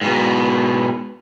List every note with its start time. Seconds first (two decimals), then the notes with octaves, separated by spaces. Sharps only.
0.01 G#2 B2